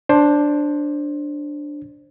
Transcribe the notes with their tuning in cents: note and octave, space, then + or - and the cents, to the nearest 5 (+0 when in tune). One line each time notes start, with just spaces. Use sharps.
D4 +0 C5 +20